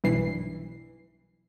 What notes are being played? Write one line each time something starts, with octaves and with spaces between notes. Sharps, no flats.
B1 G2 E3 C7